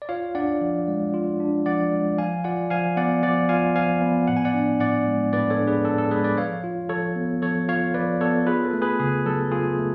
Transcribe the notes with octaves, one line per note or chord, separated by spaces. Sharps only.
D5
F4 C#5 F5
D4 D5 F#5
F3
G#3
F4
D4
F3 D5 F#5
G#3
F3 F5 G#5
F4 D5 F#5
F3 F5 G#5
B3 D5 F#5
F3 D5 F#5
F4 F5 G#5
F3 F5 G#5
B3
A2 F#5
G#5
D5 F#5
D4
A2 D5 F#5
G#3
A2 B4 D5
A4 C#5
D4
G#4 B4
A2 A4
A4
G#3 G#4 B4
B4 D5
F3 C#5 F5
F4
F3 A4 C#5
B3
F3 A4 C#5
F4 C#5 F5
F3 B4 D5
B3 A4 C#5
F4 G#4 B4
A4
A3
G#4 B4
C#3 G#4
F#3 A4
F4 G#4
A3